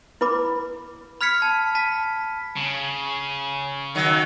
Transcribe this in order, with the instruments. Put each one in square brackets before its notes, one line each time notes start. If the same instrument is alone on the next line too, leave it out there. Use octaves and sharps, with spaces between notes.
[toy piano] E4 B4 B5 D6
[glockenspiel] B5 F6 G#6 B6 C#7
A5
A5 B6
[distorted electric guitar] C#3
[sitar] D#3 F#3